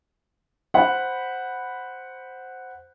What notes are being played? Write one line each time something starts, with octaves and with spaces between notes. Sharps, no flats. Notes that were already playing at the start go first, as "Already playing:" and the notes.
C5 F#5 B5